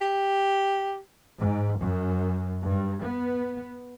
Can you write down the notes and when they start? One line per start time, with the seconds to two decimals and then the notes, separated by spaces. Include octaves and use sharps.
0.01 G4
1.39 G#2
1.80 F#2
2.63 G2
3.03 B3